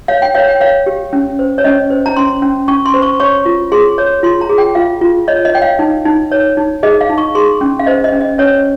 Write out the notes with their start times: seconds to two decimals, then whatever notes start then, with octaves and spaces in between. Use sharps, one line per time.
0.08 C#5 F5
0.22 G5
0.35 C#5 F5
0.48 G5
0.61 C#5 F5
0.86 G4
1.13 C#4
1.39 C5
1.58 C#5
1.64 C#4 D#5
1.90 C5
2.06 A#5
2.16 C#4 C6
2.42 C#4
2.68 C#4 C#6
2.86 C6
2.94 C5
3.02 C#6
3.20 C#5 C#6
3.45 F4
3.72 G#4 C6
3.98 C#5
4.23 F4 C6
4.41 A#5
4.49 G#4
4.58 G5
4.75 F4 F5
5.01 F4
5.28 C#5 D#5
5.45 D#5
5.53 C#5 G5
5.62 F5
5.79 D#4
6.05 D#4
6.32 C#5
6.57 D#4
6.83 G#4 D#5
7.01 F5
7.10 D#4
7.18 C#6
7.35 G#4 C6
7.61 C#4
7.79 F5
7.86 C5 D#5
8.04 D#5
8.12 C#4
8.21 D#5
8.38 C#4 C#5